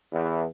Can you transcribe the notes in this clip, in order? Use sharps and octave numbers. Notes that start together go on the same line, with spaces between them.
E2